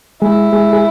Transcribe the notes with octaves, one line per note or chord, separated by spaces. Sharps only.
G#3 E4 G#4
G#3 G#4
G#4